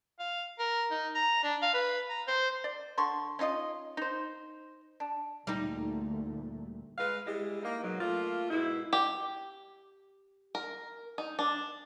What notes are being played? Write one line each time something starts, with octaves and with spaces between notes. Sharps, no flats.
F5
A#4
D#4
A#5
D4
F5
B4
A#5
C5
D5
D3 C6 C#6
C#4 D#4 F4 D#5
D#4 C5
D4
D2 A#2 G3 A3 D#4
G#3 B4 F5
G3 G#3 E4 G4
A#3 D#4
G#2 B2 F#3
A3 A#3 F4
G#2 B2 E4
G4
A#4
D#4
D4